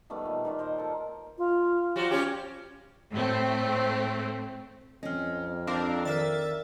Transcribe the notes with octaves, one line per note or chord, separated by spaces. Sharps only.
D#3 G3 A3 B3
A#2
A#2 D#3 A#3 F4
A#4 C5 D#5
A4 A#4
F4
F3 G3 F#4
G3 C#4 G4
A2 A3 C4
F2 C4 C#4 D#5 F6
C4 D4 A#4 F5
D#3 A#4 D5 E5 A6